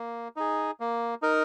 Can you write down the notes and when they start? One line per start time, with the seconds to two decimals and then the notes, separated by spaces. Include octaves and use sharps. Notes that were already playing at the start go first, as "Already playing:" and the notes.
Already playing: A#3
0.36 D#4 G#4
0.80 A#3
1.22 D#4 A#4